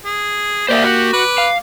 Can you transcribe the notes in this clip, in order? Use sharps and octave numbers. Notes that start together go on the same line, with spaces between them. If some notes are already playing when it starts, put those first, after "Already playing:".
G#4
A#3 G4 C5 D5 E5
F#4
B4 D6
F5